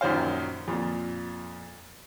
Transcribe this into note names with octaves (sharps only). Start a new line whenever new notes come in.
A#1 F#2 D#3 C5 F5
F2 A#2